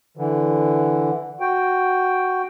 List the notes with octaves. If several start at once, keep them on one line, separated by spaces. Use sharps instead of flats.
D3 E3
F#4 G5